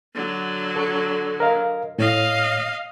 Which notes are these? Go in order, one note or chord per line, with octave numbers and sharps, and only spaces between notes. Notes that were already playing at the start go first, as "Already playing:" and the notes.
D3 F#3
A4 C#6
A#4 D#5 F5
A2 C#5 D#5 F5